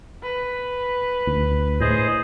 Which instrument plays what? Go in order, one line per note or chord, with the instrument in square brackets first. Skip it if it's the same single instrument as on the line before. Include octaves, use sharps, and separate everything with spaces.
[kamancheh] B4
[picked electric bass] D2
[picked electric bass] A2 [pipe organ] G#4 C5 D#5